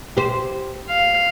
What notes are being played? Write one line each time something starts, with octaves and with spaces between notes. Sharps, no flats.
G4 C5
F5